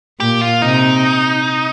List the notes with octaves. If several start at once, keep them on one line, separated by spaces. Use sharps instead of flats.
A#2 G4
F4
C3 D#4